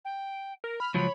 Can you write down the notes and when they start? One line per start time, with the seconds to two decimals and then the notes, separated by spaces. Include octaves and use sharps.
0.04 G5
0.64 A#4
0.80 B5 F6
0.94 C#2 F3 F#3 C#5 B5